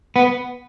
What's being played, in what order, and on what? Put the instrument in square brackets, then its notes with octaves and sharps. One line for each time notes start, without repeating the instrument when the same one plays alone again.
[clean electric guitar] B3